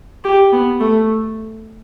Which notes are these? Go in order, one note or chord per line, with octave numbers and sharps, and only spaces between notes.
G4
B3
A3